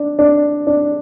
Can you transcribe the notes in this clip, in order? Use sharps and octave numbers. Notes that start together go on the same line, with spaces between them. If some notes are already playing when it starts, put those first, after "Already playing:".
Already playing: D4
D4
D4